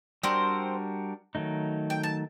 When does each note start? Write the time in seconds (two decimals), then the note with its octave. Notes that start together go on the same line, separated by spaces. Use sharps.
0.23 G3 C4 D4 F#4 A#4 C5
1.35 D#3 F#3 A3 D#4
1.90 G5
2.03 A5